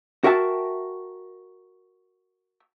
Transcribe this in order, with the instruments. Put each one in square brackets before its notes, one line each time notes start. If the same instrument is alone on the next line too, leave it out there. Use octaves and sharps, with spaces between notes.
[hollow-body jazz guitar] F#4 A#4 E5 G5 A5